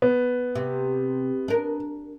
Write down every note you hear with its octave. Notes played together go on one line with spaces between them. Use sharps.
B3
C3
D4 A#4